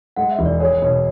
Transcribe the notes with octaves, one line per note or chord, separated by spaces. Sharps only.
G#3 F#5
E5
E1
D5
G#4 C#5
B2 C#5